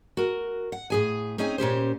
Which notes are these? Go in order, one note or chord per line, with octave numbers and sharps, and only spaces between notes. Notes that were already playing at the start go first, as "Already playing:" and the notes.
F#4 A#4
F#5
A2 G#4 G#5
C4 C#4 D#4 G#4 C#5 G#5
A#2 C#4 G4 C5